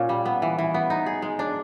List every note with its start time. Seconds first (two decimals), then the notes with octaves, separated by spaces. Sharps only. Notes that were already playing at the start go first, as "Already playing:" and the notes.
Already playing: A#2 C#4
0.09 G3
0.26 B3
0.42 E3
0.59 E3
0.74 B3
0.90 D#4
1.06 G#4
1.22 G#3
1.39 D4